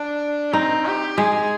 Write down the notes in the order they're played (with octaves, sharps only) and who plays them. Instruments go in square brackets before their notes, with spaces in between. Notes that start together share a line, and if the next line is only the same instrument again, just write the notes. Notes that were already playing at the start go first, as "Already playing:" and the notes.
Already playing: [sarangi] D4
[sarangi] C4 [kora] D#4
[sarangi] G4
[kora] G#3 [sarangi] G#4